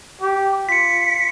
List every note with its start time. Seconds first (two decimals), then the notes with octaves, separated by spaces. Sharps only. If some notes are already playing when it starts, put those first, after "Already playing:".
0.21 G4
0.69 F4 B6 C#7